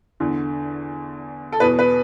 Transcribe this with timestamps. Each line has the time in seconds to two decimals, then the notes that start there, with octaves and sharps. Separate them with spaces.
0.20 E2 D3
1.52 A4
1.60 E2 B2 B4
1.79 B4